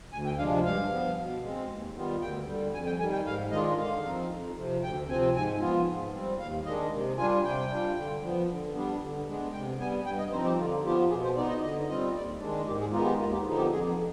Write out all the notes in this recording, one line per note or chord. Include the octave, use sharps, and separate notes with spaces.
D2 G#5
G5
C3 F3 G#3 D4 F5
G2 F5
F3 B3
B2
G#3
C4
D#2
D#3 G3 B3 F4
D2 G5
D3 G3
F2 G#5
G5
D#3 G3 G#5
G5
G#2 F5
D#3 G#3 D4 F4 D#5
D3 F5
F3 C4 D#4
F2
C3 F3
D2 G5
C3 F3 C4 G#5
G#2 G#5
F3 B3 F4
G#2
G3 C4
D#2 F5
D#3 G#3 D4 D#5
C3
G3 D4 F4 G#5
C3 G5
G3 D4 F4
D3
F3 B3
D3
G3 B3 D4
D3
G#3 B3 D4
C3 G5
G3 B3 G#5
G2 G5
D#5
F3 C4 D#4 C5
G4
D3 F4
F3 B3 F4 G4
B2 G#4
C5
B3 D#4 D5
D#5
D3 D#5
G3 C4 F4 D#5
D#2 D5
D#3 G#3 D4
G#2 G4
G#4
D#3 G#3 B3 D#4 F4
G4
D#2 F4
G4
D3 F3 B3 D#4
G4
F2 G#4